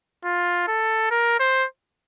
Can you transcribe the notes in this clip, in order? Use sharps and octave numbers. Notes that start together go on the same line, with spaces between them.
F4
A4
A#4
C5